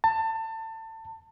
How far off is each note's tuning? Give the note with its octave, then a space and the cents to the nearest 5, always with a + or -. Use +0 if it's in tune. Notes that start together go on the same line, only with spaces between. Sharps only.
A5 +25